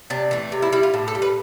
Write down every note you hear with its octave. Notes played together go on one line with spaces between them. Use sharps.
C3 D4
E3 A3
C3
E4
G3 E4
F4
A2
A4
G3
B4